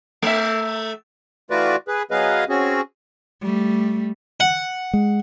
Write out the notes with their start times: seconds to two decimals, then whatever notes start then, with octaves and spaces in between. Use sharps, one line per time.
0.22 A3 E5
1.51 E3 A3 F4 F#4 B4 D5
1.88 G#4 B4
2.11 F#3 B3 G#4 B4 D#5 F5
2.49 C4 C#4 F#4 G#4
3.41 G3 A3
4.40 F#5
4.93 G#3